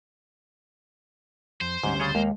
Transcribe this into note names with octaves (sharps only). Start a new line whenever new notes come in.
F2 C5
D2 G#2 G3 C#4
C#3 G#4 C#5 A6
D#2 G#3 A#3